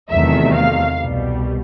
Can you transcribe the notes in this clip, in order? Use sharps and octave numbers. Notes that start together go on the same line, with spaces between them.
E2 C3 D#3 F#3 A3 E5
F5
C2 B2 G3